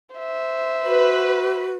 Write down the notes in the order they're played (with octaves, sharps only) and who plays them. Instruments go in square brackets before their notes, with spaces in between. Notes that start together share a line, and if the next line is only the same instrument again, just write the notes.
[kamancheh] C5 E5
[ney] F#4 [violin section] B4